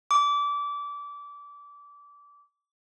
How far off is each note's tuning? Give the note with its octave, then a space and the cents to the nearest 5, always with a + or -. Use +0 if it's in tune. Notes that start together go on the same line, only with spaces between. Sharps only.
D6 -25